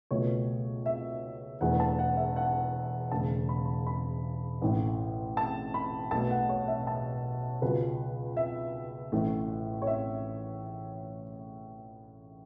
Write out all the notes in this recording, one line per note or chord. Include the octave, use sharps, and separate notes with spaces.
C#2 B2 F#3 A3 C#5
E5
E1 E2 E3 A3 F#5
A5
F#5
E5
F#5
E1 E2 C#3 A3 A5
B5
B5
B5
A1 A2 A3
A5
B5
B1 B2 A3 A5
F#5
C#5
E5
A5
C#2 B2 F#3 B4
E5
A1 A2 A3
C#5
E5